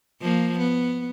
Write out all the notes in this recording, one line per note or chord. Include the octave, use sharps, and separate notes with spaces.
F3 A#3
B3